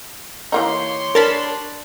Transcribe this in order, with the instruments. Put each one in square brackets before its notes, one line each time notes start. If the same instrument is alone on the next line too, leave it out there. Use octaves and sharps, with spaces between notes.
[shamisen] E3 A#3 D#4 [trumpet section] G4 C#5 C6
[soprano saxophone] D4 [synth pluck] A#4 A5 B5